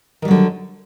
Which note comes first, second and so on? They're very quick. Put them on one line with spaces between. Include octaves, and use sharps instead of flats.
D#3 G3 F#3 D3